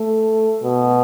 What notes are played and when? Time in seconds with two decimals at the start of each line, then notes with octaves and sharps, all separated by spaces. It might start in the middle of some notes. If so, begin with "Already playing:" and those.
Already playing: A3
0.63 B2